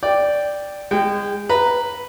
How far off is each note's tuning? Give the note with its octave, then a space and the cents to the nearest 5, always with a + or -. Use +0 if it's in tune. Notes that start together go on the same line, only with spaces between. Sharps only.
D5 +0 G5 +0
G#3 -30 G5 +0
B4 +0 A#5 +0